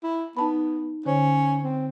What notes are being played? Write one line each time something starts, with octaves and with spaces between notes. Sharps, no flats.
E4
B3 D#4 A5 B5
D3 C#4 C5 C#5
C4